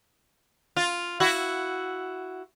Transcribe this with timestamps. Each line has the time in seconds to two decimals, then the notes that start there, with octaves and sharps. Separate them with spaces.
0.77 F4
1.20 E4 F#4